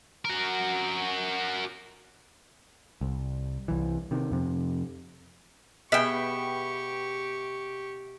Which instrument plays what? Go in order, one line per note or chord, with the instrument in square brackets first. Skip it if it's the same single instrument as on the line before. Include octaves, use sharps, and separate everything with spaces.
[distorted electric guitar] F#4 A#4
[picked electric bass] C2
C2 E3
C3 D#3
F2 C3
[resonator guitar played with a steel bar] B2 B3 G#4 [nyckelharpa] G4 C#6 [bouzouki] E5 G5